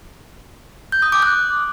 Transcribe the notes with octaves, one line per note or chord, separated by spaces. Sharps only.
G6
D#6
D6
F#6